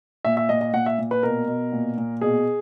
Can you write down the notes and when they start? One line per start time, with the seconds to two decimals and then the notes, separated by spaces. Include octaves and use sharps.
0.25 A#2 E5
0.37 E5
0.49 A#2 D#5
0.61 D#5
0.73 A#2 F#5
0.86 E5
0.98 A#2
1.11 B4
1.23 B2 A#4
1.48 B2
1.72 A#2
1.97 A#2
2.21 B2 G#4